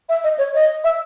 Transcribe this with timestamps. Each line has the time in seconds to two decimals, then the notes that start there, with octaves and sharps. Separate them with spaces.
0.09 E5
0.24 D#5
0.38 C#5
0.55 D#5
0.84 E5